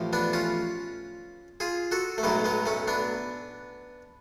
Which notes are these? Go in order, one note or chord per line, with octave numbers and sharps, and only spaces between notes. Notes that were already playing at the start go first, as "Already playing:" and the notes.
Already playing: A1 A2 F3
B3 D4
C#4 F4
F4 G#4
F#4 A4
A3
B1 A2 F#3 G#3 B3
G#3 B3
A3 C#4
B3 D4